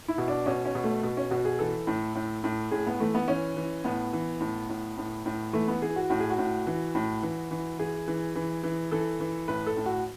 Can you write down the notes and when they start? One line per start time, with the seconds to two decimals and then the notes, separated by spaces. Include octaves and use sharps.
0.08 E4
0.18 B2
0.28 D4
0.46 B2 C#4
0.65 C#4
0.75 B2
0.84 A3
1.03 B2
1.17 C#4
1.30 B2 F#4
1.45 G#4
1.59 E3 A4
1.87 A2
2.15 A2
2.44 A2
2.71 A2 G#4
2.87 B3
3.00 E3 A3
3.15 B3
3.28 E3 C#4
3.57 E3
3.84 A2 B3
4.13 E3
4.40 A2
4.69 A2
4.98 A2
5.26 A2
5.53 E3 A3
5.68 B3
5.82 E3 G#4
5.96 F#4
6.10 A2 F#4
6.20 G#4
6.30 F#4
6.38 A2
6.67 E3
6.95 A2
7.23 E3
7.51 E3
7.79 E3 G#4
8.08 E3
8.35 E3
8.63 E3
8.91 E3 A4
9.20 E3
9.48 A2 B4
9.67 A4
9.77 A2
9.86 F#4